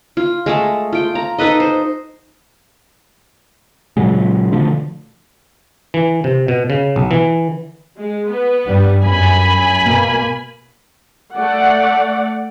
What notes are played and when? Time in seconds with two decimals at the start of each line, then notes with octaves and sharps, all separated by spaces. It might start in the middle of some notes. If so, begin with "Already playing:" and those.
0.17 F4
0.46 G#3 A3 A5
0.93 F4 G5
1.15 A#5
1.38 D#4 A4 B4 D#5
1.60 C5
3.97 A#2 C#3 F#3 G#3
4.52 B2 D3 F3 A3
5.94 E3
6.24 C3
6.48 B2
6.70 C#3
6.96 B1
7.11 E3
7.98 G#3
8.27 B3 B4
8.64 G2 G3
9.02 F#2 G#5 B5
9.84 B2 A#3
11.36 A3 D5 F#5